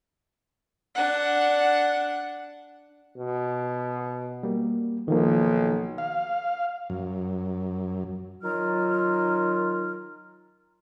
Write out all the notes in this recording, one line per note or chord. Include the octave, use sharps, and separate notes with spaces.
D4 F#5
B2
G3 A#3
B1 D#3 F3 A#3
F5
F#2
D#3 F#3 D#4 F4 F6